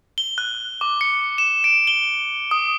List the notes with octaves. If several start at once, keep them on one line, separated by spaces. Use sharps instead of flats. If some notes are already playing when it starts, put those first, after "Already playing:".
G7
F#6
D6
C#7
E7
D7
G7
D#6